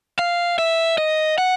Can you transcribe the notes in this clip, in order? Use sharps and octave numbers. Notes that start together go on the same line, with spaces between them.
F5
E5
D#5
F#5